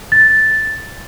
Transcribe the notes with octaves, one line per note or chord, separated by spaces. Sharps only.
A6